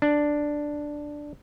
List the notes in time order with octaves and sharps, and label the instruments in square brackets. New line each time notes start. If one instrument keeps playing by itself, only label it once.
[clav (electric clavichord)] D4